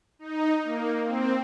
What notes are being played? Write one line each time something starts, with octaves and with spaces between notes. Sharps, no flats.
D#4
A#3
C4